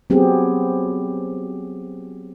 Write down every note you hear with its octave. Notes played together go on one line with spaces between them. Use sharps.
F#3 B3 C4 G4 G#4